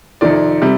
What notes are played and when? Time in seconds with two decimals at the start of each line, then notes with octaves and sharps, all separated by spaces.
0.21 F2 C3 D#3 D5
0.62 C3 G3